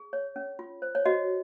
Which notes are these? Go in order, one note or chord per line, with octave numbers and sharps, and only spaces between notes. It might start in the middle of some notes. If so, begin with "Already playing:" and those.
Already playing: G#4
C#5
C#4
F4
C5
C#5
F#4 D#5